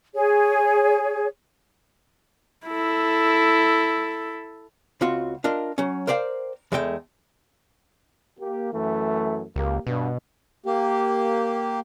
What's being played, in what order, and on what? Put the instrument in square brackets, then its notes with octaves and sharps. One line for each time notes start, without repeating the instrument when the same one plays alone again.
[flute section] G#4 C#5
[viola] E4 A4
[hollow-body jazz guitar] C#2 C4 F4 F#4
D4 F4 A#4 D#5
F#3 C#4
A#4 C5 D5 F5 G5
E2 G#3 A3 G#4 G5
[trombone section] A#3 G4
F#2 E3 A3
[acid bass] C#2 [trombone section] A#3 G4
[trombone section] G2 [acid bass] B2
[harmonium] A#3 G4